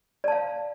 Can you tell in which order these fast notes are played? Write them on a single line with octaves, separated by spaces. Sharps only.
D5 A5 F5